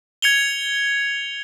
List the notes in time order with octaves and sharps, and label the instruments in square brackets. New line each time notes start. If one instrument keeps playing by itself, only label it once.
[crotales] G#6 C#7 F7 G7